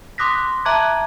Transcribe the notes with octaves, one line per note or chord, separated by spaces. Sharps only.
C6 D6 D#6 F#6 A#6 B6
E5 A5 A#5 D6 F#6 G#6